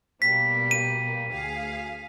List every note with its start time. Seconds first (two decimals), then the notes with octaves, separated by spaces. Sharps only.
0.22 B2 G3 A#3 B6
0.71 D#7
1.32 D2 G#4 F5